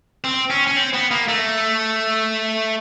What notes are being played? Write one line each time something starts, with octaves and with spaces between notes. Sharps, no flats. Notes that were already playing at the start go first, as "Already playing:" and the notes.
C4
C#4
C#4
C4
B3
A#3
A3